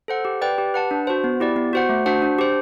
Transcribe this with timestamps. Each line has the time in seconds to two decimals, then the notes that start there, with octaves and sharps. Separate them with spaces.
0.08 A4 C5 F#5
0.25 G4
0.42 B4 D5 G5
0.58 G4
0.74 B4 F#5 A5
0.91 D4
1.07 F#4 C5
1.24 B3
1.40 E4 G4 D5
1.56 B3
1.73 F#4 C5 F#5
1.89 A3
2.06 D4 F#4 C5 F#5
2.22 D4
2.39 G4 C5